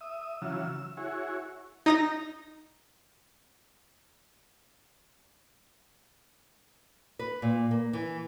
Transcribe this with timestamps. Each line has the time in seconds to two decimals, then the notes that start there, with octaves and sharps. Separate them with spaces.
0.01 E5 D#6
0.42 C#3 E3 F#3 F4 E6
0.66 E6
0.97 E4 F#4 G#4 C#5
1.86 D#4 D#6 A#6
7.19 B4
7.42 A#2
7.71 A#3
7.93 E3